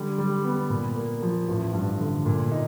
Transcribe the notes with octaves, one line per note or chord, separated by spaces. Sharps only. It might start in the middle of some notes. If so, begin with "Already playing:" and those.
Already playing: D3 G3
G3
B3
A#2
A#3
F3
A1
G2
D3
A#2
D#4